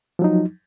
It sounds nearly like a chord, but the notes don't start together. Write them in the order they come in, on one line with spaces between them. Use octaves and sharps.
F3 F#3 D#4